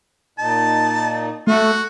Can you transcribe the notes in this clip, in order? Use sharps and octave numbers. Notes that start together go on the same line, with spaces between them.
A#2 D#4 A5
A3 F#4